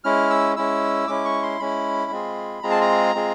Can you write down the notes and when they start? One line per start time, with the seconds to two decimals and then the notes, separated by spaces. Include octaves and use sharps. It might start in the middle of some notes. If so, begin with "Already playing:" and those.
0.04 G#3 C#4 E4 F6
0.30 E6
0.56 G#3 C#4 E4 E6
1.08 G#3 C#4 E4 D6
1.25 C#6
1.43 C6
1.60 G#3 C#4 E4 B5
2.11 G#3 C4 F4 G#4
2.63 G#3 C4 F4 G#4 A#5
2.71 A5
2.81 A#5
3.15 G#3 C4 F4 G#4